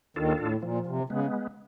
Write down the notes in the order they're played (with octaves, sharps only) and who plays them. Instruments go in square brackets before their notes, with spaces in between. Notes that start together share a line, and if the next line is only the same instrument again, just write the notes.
[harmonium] D#2 D#3 [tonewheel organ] D4 F4 A4
[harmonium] A2
[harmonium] A#2 [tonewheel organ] F3
[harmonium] C3
[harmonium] C#3 [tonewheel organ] G#3 B3